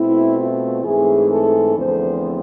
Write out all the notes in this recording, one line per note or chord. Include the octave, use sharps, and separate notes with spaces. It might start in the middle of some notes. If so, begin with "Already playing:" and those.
Already playing: B2 A3 C4 E4
F4
G#2 E3 A3 C4 G#4
A4
E2 D3 F3 A3 C4 C5